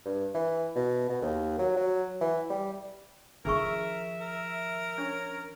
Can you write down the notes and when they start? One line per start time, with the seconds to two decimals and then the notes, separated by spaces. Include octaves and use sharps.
0.05 G2
0.34 E3
0.75 B2
1.09 B2
1.22 D#2
1.59 F#3
1.77 F#3
2.21 E3
2.50 G3
3.45 D#3 F3 D4 G#4 A#4 E5 C#6
4.21 A#4
4.98 C#4 D4 C#5